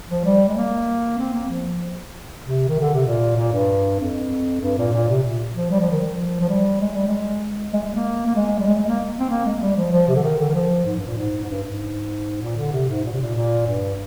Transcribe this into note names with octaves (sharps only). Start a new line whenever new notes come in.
F3
G3
G#3
A#3
C4
A#3
F3
C3
D#3
D3
C3
A#2
A#2
G2
F2
G2
A#2
A#2
C3
A#2
F3
G3
F3
D#3
F3
F3
G3
G#3
G3
G#3
G#3
G#3
A#3
A#3
G#3
G3
G#3
G#3
A#3
C4
A#3
G#3
G3
F3
F3
C3
D3
D#3
D3
D#3
F3
G#2
G2
A#2
G#2
G#2
G2
G#2
A#2
D3
C3
G#2
A#2
C3
A#2
A#2
G2